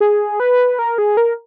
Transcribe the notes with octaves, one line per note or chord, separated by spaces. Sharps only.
G#4
B4
A#4
G#4
A#4